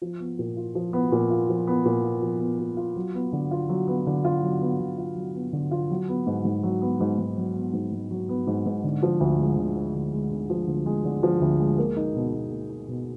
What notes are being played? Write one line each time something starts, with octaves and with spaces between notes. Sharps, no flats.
F3
B3
A#2
F4
F3
B3
A#2
F4
F3
B3
A#2
F4
F3
B3
A#2
F4
F#3
B3
D3
F4
F#3
B3
D3
F4
F#3
B3
D3
F4
F#3
B3
D3
F4
F#3
B3
G#2
G#2
F#3
B3
G#2
G#2
F#3
B3
G#2
G#2
F#3
B3
G#2
G#2
D3
F3
D2
G#3
D3
F3
D2
G#3
D3
F3
D2
G#3
D3
F3
D2
G#3
A#3
D#4
B2
B2
A#3
D#4
B2